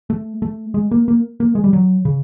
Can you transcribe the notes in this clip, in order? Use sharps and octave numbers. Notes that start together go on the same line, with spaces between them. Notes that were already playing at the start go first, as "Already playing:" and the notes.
A3
A3
G#3
A#3
A#3
A#3
G#3
G3
F#3
C#3